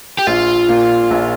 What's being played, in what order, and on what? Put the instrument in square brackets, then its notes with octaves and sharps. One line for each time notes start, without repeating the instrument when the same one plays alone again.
[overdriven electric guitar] G4
[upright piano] A#1 [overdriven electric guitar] F4
[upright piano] A#2
A#1